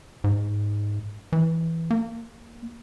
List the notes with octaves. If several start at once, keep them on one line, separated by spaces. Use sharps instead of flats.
G#2
E3
A#3